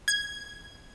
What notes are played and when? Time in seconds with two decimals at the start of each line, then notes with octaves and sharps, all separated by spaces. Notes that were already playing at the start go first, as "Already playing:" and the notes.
0.08 G#6